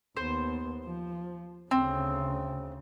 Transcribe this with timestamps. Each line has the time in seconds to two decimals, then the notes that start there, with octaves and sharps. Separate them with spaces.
0.17 D#2 B3 C5
0.85 F3
1.71 D2 C#3 C4